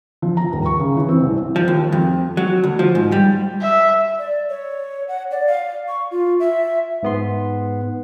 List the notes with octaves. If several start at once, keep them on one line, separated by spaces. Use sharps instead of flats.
F3
A#5
D#1
C#6
C#3
E3
C4
C2
F3
D#2
F2
F#3
D2
F3
G#2
G3
E5
D5
C#5
F#5
D5
F5
C#6
F4
E5
G#2 B3 C6